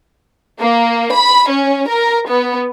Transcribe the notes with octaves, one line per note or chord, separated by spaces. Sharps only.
A#3
B5
C#4
A#4
B3